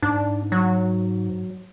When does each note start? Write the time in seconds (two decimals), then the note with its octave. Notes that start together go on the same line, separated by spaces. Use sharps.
0.02 G#2 D4
0.52 F#3